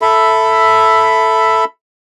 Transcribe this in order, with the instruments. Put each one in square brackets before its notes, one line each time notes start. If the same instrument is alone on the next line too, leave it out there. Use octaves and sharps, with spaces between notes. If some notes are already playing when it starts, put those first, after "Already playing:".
[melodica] A4 E5 B5